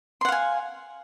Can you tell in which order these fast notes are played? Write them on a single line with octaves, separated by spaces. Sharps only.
C6 F#5 F5 G#5